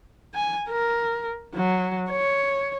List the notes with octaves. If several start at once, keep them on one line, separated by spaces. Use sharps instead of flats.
G#5
A#4
F#3
C#5